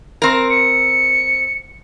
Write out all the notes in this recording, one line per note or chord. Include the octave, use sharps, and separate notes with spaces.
C4 A#4
C#7